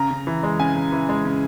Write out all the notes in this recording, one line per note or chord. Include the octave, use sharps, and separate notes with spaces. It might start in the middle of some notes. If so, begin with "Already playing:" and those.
Already playing: C#3 A#5
C#3
E3
G#3
C#3 G#5
C#3
E3
G#3
C#3